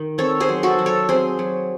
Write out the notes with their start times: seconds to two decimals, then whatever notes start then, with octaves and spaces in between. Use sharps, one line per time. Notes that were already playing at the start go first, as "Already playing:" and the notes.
Already playing: D#3
0.18 C4 A4 C#5
0.40 G#4 C5
0.49 F#3
0.63 F#4 A4
0.79 F#3
0.86 A4 C#5
1.09 C4 G#4 C5
1.39 F#3